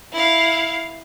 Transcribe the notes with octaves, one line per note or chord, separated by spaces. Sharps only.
E4 F5